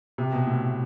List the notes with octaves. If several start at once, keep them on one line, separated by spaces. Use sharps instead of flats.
C3
B2
A2